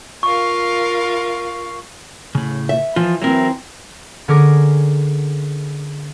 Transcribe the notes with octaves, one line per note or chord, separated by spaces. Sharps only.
F4 A#4 F5 C#6
A2 C#3
E5
E3 F3 F4
E3 F#3 C4 E4 A#4
D3 C#4 G#4 A#4 D6 A#6